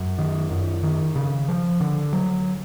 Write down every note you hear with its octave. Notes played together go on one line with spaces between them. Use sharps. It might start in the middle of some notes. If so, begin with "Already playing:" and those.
Already playing: F#2
D#3
F#2
D#3
C#3
F3
D3
F#3